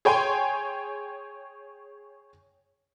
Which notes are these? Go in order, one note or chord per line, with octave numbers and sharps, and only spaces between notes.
G#4 C#5 G5 G#5 C6